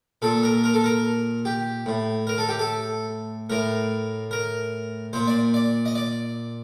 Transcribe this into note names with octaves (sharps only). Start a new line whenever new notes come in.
A#2 A4
A#4
A#4
A4
A#4
G4
A2
A#4
A4
G4
A4
A2 A#4
A#4
A#2 C5
D5
D5
D#5
D5